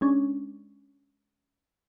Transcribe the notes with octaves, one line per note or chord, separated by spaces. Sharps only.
G#3 C#4 D4